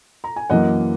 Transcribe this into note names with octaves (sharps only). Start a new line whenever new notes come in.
A#5
G#5
F#2 E3 A#3 D#5 F#5